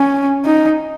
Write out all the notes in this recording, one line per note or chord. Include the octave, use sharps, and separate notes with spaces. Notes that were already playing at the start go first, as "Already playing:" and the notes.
Already playing: C#4
D#4